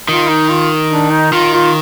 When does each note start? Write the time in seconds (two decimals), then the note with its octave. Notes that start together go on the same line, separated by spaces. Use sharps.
0.09 D#3 F4
0.29 D#4
0.50 F4
0.91 D4
1.12 D#4
1.32 D#3 F4
1.53 F4